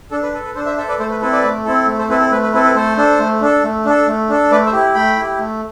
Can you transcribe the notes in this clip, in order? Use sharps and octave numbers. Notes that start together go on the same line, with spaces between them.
D4 A4
B4
A4 B4
B4
D4 A4 C5
C5 E5
A4 C5 E5
B4 D5
A3 A4 C5
B4
C4 E4 A4 B4
B4 D5
A3
C4 E4 A4
A3
A4 C5
C4 E4 A4 B4
A4
A3 B4
B4
C4 E4 A4 B4
B4
A3 A4 C5
D4 A4
A3
D4 A4
A3
D4 A4
A3
D4 A4
A3 B4 D5
C5 E5
E4 G4
A3 G5 B5
E4 G4
A3